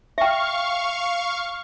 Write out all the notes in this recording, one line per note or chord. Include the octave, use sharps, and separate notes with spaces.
E5 F5 G5 C#6